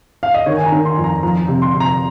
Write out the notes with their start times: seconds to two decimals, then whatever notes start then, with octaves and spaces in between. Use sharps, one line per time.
0.23 F5
0.34 D#5
0.46 D#3 C#5
0.57 G#5
0.66 A#5
0.72 D#3
0.85 C6
0.97 F2
1.04 A#5
1.23 F3 A#5
1.48 C3
1.62 C6
1.74 C3
1.80 A#5